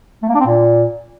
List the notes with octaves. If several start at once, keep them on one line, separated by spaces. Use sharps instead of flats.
A3
A#3
D4
C4
A#2